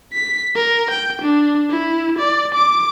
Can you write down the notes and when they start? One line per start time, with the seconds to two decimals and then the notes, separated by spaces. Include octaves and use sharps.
0.13 B6
0.55 A#4
0.91 G5
1.22 D4
1.70 E4
2.19 D5
2.55 D6